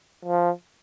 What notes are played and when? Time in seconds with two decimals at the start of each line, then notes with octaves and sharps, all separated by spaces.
0.25 F3